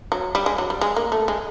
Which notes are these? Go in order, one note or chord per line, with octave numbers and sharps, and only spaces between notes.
F#3
G3
G#3
F#3
G3
G#3
A#3
A3
G#3